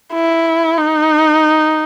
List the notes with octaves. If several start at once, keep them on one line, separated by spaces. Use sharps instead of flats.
E4
D#4